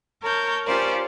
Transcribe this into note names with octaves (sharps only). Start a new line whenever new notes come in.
A#4 C#5 A5 G6
C#4 F4 G4 A#4 C5 D5